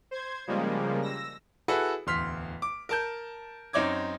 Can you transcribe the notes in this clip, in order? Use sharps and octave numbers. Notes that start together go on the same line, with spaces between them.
C5 G#6
C#3 F3 G3 G#3 A#3
E6 A#6
E4 F#4 G#4 A4 B4
D1 E2 C6 F6 B6
D6
A#4 A5 G6
F#2 C4 D#4 C#5 D6 G#6